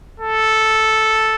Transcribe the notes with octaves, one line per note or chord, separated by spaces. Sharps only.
A4